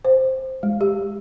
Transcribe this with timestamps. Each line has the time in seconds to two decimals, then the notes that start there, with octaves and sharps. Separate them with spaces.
0.05 C5
0.63 G#3
0.81 G4